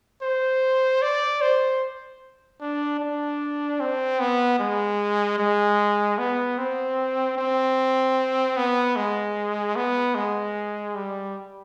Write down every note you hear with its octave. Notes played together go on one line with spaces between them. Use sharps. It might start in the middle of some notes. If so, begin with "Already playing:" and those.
C5
D5
C5
D4
D4
C4
B3
G#3
G#3
B3
C4
C4
B3
G#3
B3
G#3
G3